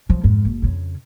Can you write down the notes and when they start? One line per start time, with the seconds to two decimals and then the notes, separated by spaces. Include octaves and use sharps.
0.09 F3 F#3
0.24 F2 G#2
0.45 F#1
0.62 F2 C#3